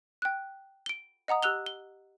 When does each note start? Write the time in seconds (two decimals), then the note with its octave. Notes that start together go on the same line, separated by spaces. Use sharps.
0.22 G5 F#6
0.86 D7 G7
1.28 D#5 F#5 A#5 D#6
1.43 G4 E6 F#6 F7 G7
1.66 G7